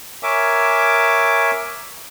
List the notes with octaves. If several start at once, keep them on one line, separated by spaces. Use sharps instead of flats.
A#4 C#5 E5 G#5 D6